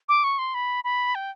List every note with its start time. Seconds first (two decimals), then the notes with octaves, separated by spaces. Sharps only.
0.09 D6
0.24 C#6
0.39 C6
0.54 B5
0.84 B5
1.15 G5